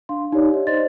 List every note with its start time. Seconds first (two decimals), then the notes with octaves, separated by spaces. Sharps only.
0.09 D4 F5 C6
0.32 D#4 G4 C#5 D5
0.49 D5 D#5
0.67 C5 D5 D#5 C6 A6